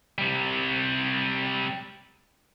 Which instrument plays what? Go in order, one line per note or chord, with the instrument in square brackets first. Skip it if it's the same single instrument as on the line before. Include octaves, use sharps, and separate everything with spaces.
[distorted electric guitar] C3 G3